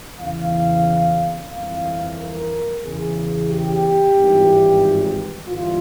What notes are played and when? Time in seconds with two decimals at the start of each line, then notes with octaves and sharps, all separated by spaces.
0.19 E2 C#3 E3 F5
1.51 G1 F2 E3 F5
2.18 A#4
2.83 E2 C#3 E3 G#4
3.48 G4
4.15 G#1 G2 E3
5.47 G1 G2 E3 F4